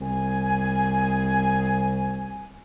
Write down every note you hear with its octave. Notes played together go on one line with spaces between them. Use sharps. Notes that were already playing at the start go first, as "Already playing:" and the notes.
C2 G#5